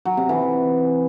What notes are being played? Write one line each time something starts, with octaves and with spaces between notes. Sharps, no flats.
F#3
C3
E3